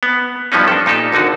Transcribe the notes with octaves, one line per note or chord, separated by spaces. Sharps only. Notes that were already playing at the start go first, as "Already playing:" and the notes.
B3
G2 F3 G3 B3 C#4 D#4
D4 A4
A#2 D#4 G4 A4
G#1 D3 D#4 F#4